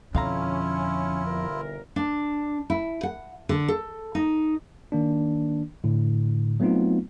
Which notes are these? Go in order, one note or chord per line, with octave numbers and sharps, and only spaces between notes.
F2 B2 D3 C#4 E4 F4 F5 A#5
G1 E3 A#4
D4
E4
F#5
D3
A4
D#4
D#3 A#3 D4
A2 D3
F#3 A3 B3 C4 D#4 F4